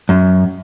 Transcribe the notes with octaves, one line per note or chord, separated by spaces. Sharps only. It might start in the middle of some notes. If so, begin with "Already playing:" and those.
F#2